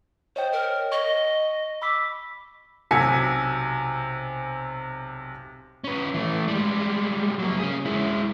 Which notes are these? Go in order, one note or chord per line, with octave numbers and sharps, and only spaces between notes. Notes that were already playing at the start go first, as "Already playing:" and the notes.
C5 C#5 D#5 G5
A#4
D#5 C#6
B5 D6 E6 B6
B1 C3 G#5 B6 C#7
C#4 B4
E3 A3
G3 G#3
F#3 A#3
C#4 G#4
G#3 E4